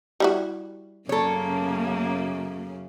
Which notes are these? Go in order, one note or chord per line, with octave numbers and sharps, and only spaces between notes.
G3 E4 F#4
F#2 C#3 A#3 A4 C#5